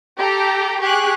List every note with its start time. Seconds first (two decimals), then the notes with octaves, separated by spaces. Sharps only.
0.18 G4 A4 G5 A#5
0.80 G4 G#4 C#6 F#6